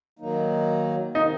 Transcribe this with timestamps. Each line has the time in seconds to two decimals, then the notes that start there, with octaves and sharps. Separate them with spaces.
0.19 D#3 F#3 A#3 D#4
1.15 C3 D#3 D#4